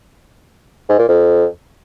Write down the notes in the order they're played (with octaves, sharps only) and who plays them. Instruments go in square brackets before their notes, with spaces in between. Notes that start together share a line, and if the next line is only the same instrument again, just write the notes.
[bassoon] G#2
A#2
F2